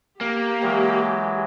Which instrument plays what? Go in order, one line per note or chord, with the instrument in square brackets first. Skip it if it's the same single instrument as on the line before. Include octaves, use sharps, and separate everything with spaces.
[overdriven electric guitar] A#3 [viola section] G4
[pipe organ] E3 F#3 G#3